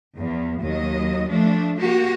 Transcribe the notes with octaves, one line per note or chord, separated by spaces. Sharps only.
E2 F3
D#2 F#3 D#5
F3 A3 D4
A#3 F#4 G4